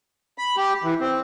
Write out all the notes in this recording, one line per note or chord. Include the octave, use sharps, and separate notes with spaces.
B5
G4
E3
C4